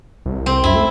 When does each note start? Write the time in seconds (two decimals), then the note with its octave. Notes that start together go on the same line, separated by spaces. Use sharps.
0.26 C2
0.46 C4
0.64 F#2 E4
0.76 A3